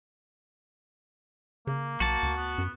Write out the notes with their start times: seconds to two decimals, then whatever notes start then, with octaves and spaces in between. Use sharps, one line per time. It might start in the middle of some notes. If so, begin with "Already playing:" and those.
1.67 C#3 A#3
2.00 B1 F#4 A5
2.23 D2
2.37 B3
2.58 F#2